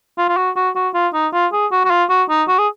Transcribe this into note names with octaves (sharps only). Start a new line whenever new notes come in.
F4
F4
F#4
F#4
F#4
F4
D#4
F4
G#4
F#4
F#4
F4
F#4
D#4
F#4
G#4